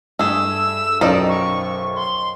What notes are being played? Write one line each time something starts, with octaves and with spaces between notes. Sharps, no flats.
G2 A3 G#4 E6
B1 F#2 D#3 F3 D#4 D5
C#6
C6